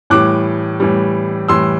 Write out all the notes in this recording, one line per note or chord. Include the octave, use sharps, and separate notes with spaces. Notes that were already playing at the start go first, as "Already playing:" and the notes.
A2 E3 G3 D6 F#6
A2 E3 G3
A2 E3 G3 C6 E6